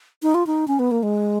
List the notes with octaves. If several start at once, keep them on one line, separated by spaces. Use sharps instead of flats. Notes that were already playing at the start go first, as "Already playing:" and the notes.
D#4
F4
D#4
C#4
B3
A#3
G#3